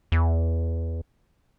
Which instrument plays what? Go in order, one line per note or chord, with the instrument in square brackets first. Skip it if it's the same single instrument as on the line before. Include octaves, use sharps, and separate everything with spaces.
[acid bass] E2